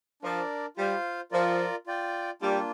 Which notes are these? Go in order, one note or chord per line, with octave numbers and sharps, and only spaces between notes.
F3 D4 A#4 D5
G3 F4 C5 F5
F3 F4 A#4 D5
F4 D5 G5
G3 A#3 D4 F4